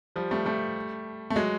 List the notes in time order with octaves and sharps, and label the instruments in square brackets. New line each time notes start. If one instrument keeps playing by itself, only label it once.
[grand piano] F3 G3
G3 A3
G3 A3
A3
F#3 G#3